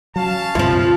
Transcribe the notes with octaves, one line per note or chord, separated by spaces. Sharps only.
F#3 C#4 F5 A5
D2 G2 C3 E3 F3 F4